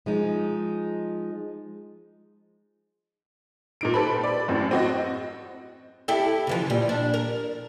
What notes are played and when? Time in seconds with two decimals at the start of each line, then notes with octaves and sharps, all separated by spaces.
0.06 F3 G#3 D#4
3.81 A#2 D#4 D7
3.94 G4 A4 B4 C5 B5
4.24 D5
4.48 F#2 A2 C4
4.71 C4 F#4 D#5
6.08 E4 G4 A4
6.47 C#3 E3 F3
6.70 A#2 G3
6.89 D4
7.14 A#4